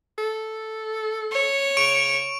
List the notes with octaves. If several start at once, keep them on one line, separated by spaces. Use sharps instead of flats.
A4
C#5
C#3 C#6 D7 F7